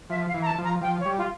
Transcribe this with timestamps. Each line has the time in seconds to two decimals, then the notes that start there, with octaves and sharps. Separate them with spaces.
0.10 F3 E5
0.28 F5
0.34 E3
0.42 A#5
0.46 A5
0.58 F3
0.64 A#5
0.81 F3 G5
1.00 C#5
1.05 G3
1.18 F4